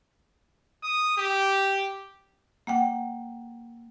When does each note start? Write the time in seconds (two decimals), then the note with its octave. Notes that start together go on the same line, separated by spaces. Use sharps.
0.83 D#6
1.18 G4
2.67 A#3 F#5 G5